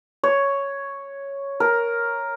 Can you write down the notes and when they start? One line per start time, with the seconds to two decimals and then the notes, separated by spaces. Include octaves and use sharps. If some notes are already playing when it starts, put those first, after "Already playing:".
0.23 C#5
1.60 A#4